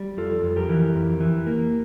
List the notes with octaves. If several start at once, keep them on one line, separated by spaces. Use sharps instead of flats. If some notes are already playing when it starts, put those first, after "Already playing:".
Already playing: G3
F2 F4 A4
F2
G4 A#4
E3
F2
E3
A#3